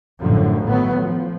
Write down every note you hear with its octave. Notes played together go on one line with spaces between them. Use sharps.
A1 F#2 A2 D3 F3
A2 D#3 F#3 B3
F3